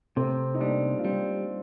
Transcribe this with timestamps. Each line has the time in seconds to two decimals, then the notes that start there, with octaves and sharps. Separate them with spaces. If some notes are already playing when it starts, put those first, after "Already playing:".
0.16 C3 A3 C4
0.54 D#4
0.60 G3 A#3 D4
0.99 F4
1.04 G3 C4 D#4